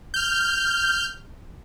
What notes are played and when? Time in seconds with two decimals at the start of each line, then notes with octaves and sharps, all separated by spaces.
0.14 F6 G6